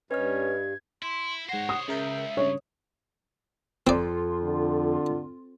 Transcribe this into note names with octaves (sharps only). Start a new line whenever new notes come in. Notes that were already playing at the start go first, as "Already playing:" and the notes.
G2 C#4 B4 D#5 F6 G#6
E4 C6
G#2 C5 C#5 F#5 A#6
D#6
C#2 C#3 A#4 E5 G6
G2 C#3 C#5
F2 C4 F4 D5
D3